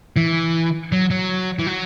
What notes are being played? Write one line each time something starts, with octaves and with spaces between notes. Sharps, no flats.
E3
F#3
F#3
E3
F#3